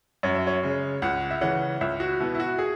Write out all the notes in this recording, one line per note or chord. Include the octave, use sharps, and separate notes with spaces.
F#2 C#5
E5
C#5
C#3 G#3
C#2 F#5
E5
C#3 E3 C#4 F#5
C#2 E5
F#4
B2 B3 E4
E4
F#4
G#4